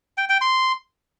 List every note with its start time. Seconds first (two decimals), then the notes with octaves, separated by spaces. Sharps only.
0.17 G5
0.29 G5
0.41 C6